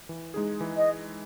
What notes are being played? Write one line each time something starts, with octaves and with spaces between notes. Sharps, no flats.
E3
G#3 D#4 G#4
E3
D#5